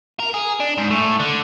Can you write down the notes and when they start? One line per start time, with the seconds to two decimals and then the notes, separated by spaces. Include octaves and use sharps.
0.20 A#4
0.34 G#4
0.60 D4
0.78 G#2
0.91 A2
1.20 D3